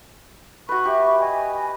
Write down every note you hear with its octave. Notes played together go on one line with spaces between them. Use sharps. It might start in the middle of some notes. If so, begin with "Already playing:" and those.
F#4 B4 C#6
G4 E5
D#5 G#5